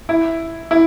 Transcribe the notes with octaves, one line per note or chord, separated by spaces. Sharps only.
E4
E4